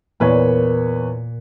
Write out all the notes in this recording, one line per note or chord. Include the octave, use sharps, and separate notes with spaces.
E2 A#2 B4 C#5